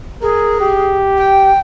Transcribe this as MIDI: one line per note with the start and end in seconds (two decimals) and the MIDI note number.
0.22 0.97 68
0.22 0.60 70
0.61 1.52 67
1.17 1.59 79